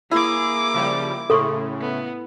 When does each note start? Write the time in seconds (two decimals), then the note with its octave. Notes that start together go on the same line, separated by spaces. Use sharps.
0.11 A#3 E4 G#4 D6
0.74 C#3 F3 G3
1.30 A2 C#3 A4 C6 C#6
1.81 B3